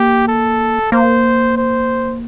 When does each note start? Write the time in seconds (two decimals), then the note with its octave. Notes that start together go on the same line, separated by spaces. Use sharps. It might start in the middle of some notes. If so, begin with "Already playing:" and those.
Already playing: A#3 G4
0.28 A4
0.92 A#3 C5
1.57 C5